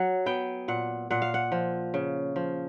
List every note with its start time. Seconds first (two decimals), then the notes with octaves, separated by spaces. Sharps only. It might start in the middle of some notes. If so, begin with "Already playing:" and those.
Already playing: F#3 F#5
0.26 B3 G5
0.68 A#2 F#5
1.10 A#2 F#5
1.22 F5
1.34 F#5
1.52 F3
1.94 C#3
2.36 F3